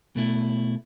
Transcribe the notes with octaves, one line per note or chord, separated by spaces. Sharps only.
B2 A3 E4